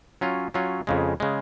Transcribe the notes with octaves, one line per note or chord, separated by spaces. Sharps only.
F#3 C#4 F4
F#3 C#4 F4
F2 C#3 G#3
C#3 G#3